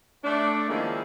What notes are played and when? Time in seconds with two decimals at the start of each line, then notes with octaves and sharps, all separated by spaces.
0.24 A3 D4 D5
0.68 D#3 F3 G#3 A#3 C#4 E4